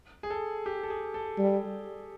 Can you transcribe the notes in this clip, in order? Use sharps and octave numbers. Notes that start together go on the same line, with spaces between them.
G#4
A4
G4
A4
G#4
A4
G3